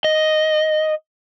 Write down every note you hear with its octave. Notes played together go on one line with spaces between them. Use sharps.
D#5